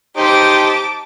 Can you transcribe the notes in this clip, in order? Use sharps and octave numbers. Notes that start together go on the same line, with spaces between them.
D#4 G4 C5 A5 D6